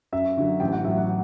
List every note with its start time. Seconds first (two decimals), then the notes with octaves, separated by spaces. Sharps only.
0.13 F#2 E5
0.37 D3 F#3
0.60 A1 G5
0.72 F#5
0.84 A2 F#3 E5
0.98 F#5